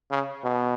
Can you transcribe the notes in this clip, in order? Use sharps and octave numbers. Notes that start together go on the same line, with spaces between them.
C#3
B2